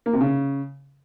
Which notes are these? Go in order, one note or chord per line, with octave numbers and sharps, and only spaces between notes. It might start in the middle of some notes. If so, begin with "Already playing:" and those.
A#3
C3
C#3